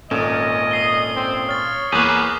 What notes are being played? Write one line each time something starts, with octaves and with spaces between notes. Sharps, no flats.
G#1 A#2 C#4 A4 D#5
D#6 C7 G7
C4
C#5 F6 A6
E2 A#3 G#4 B4 C#6 D6 G6